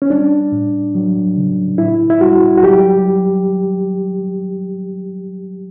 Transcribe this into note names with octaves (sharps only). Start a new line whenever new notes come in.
C#4
G3 D4
A2
F#3
C#3
A2 E4
E4
G3 F#4
F#4
F#3 G4